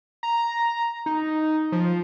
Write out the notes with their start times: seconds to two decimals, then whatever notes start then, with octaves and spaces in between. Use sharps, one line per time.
0.23 A#5
1.06 D#4
1.72 F3